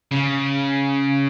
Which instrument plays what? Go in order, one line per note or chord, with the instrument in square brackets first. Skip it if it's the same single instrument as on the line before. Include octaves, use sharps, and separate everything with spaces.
[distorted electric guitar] C#3